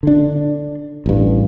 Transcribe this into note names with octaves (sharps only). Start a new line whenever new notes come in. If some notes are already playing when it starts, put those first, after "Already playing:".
D3 D4
A1 G2